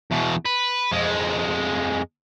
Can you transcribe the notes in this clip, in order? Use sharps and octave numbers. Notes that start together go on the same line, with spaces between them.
E2 B2
B4
F2 G#3